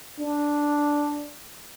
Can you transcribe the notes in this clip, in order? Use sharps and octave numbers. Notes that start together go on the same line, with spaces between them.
D4